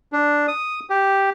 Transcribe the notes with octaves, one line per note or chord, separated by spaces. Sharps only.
D4
D#6
G4